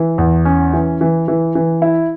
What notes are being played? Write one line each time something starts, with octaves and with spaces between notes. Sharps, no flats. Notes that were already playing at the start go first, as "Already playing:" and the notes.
Already playing: E3
E2
C#4
E3
E3
E3
E3
E4